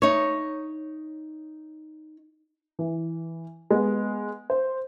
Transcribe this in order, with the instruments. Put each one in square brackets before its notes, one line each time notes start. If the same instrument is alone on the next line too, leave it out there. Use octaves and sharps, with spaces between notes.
[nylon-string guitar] D#4 C#5
[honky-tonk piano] E3
G#3 B3
C5